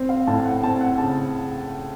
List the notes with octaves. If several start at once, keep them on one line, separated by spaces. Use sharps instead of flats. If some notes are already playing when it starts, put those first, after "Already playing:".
Already playing: C4
F5
A2 A5
F#5
C4 A5
F#5
C#3 A5